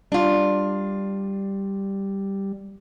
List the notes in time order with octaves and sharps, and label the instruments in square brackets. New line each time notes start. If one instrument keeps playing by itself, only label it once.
[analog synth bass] G3 [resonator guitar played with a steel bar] D4 F4